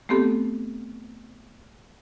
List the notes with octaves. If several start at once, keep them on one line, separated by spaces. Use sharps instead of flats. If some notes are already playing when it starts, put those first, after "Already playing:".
A3 B3 C4 G4 A4